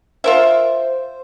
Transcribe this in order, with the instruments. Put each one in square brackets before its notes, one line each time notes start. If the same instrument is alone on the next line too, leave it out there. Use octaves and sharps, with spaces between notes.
[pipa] F4 A#4 E5 [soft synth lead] C5